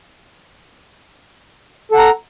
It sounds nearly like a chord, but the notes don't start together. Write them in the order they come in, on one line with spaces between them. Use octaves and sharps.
A4 F#5 A#5